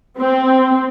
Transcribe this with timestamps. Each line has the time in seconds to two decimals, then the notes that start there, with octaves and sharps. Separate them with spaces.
0.20 C4